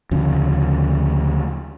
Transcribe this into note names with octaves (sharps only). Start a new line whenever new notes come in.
D2 C#3 F3